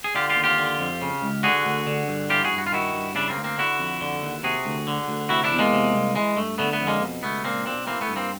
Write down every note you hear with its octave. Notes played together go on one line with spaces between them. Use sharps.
G#4
D3 F4 G4
F4 G4
D#2
F4 G4
D3
F2
C#3
C#2
D3 F#4 G#4
D2
D3
G2
E3 F4 G4
F#4 G#4
G2
F#4
F4
D#3 E4 F#4
G2
C#3 D4 E4
A#3 C4
D2
A#3 C4
D3 E4 F#4
F2
D3
D#2
C3 F#4 G#4
D2
D3
D2
C3 E4 F#4
D4 E4
E2
G#3 A#3
C3
C2
E3 G#3
G2 A3
D3 A3 B3
A3 B3
F2
G#3 A#3
B2
C#2 A3 B3
A#2 A#3 C4
B1 C4 D4
E3 A#3 C4
A3 B3
G2
A#3 C4